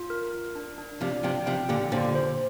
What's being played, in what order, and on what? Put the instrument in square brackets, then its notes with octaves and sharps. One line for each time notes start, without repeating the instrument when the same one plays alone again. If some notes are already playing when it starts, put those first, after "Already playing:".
Already playing: [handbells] F4
A#4
A#4
D4
D4
[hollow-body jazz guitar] C3 F3 [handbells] D5
[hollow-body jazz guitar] C3 F3 [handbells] G5
[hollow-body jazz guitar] C3 F3 [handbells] G5
[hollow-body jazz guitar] A#2 D3 [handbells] G4
[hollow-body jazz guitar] A#2 D3 [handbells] C5
[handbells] C5